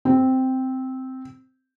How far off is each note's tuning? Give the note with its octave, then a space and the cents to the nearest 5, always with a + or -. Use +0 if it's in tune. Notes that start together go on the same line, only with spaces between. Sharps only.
C4 -5